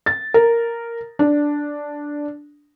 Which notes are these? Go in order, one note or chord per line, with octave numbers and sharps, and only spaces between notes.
A6
A#4
D4